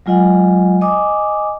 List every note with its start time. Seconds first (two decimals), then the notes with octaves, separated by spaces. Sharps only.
0.06 F#3 G#3 F4 D#5 F#5 G#5
0.81 D#5 G#5 D6 D#6